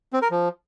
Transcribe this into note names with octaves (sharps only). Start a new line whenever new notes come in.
C4
A#4
F3